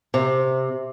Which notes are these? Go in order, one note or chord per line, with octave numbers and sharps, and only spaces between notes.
C3